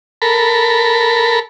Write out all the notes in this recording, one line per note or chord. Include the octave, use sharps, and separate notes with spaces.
A4 A#4 B5